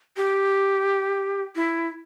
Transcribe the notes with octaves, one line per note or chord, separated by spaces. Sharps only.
G4
E4